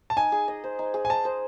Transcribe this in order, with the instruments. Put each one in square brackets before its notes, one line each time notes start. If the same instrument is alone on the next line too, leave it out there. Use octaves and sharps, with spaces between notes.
[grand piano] A5
[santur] D#4 [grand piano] G#5
[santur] G#4
D#5
C5
D#4
G#4
[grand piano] G#5
[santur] D#5 [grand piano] A5
[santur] C5